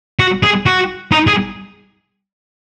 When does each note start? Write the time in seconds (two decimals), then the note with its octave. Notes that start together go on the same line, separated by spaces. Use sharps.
0.19 F#4
0.43 G#4
0.66 F#4
1.12 D#4
1.27 G#4